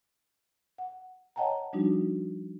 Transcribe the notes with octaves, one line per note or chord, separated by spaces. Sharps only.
F#5
C#5 D#5 F#5 G5 A5 A#5
F3 G3 D4 D#4 F#4